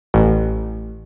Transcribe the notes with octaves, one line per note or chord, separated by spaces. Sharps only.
A1